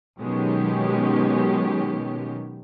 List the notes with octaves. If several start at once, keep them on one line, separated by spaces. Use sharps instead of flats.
B2 D#3 F#3 G#3 C#4 G4